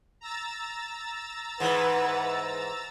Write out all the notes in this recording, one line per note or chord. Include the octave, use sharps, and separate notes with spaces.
A#5 E6 A6
G#2 E3 B4 F#5